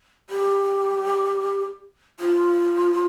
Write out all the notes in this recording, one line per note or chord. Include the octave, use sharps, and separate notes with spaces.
G4
F4